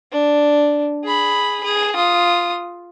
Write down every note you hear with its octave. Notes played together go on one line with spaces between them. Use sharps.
D4
G#4 B5
G#4
F4 D#6